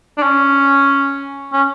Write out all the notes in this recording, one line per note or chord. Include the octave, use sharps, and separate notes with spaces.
D4
C#4
C#4